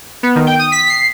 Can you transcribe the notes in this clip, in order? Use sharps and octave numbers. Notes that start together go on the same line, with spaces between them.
B3
D#3
G5
D#6
B6
C7